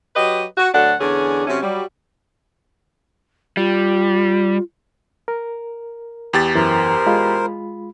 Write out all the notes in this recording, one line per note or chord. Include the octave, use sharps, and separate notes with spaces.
F#3 G4 B4 D#5
F#4
D2 F#3 D4 A4 F#5
E2 D3 C#4 D4 G#4
C3 F#3 A3 C#4
F#3 G3
G3 F4
A#4
E2 G4 A6
F#2 E3 A#4 C5
G#3 F4 B5